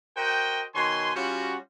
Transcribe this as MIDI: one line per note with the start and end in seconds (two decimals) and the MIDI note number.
0.17 0.63 66
0.17 0.63 70
0.17 0.63 72
0.17 0.63 75
0.17 0.63 79
0.75 1.11 47
0.75 1.11 51
0.75 1.11 73
0.75 1.11 80
0.75 1.11 84
1.16 1.55 55
1.16 1.55 61
1.16 1.55 65
1.16 1.55 66